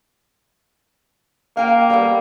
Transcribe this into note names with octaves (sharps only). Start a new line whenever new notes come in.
A#3 F5 G5
G3 B3 A4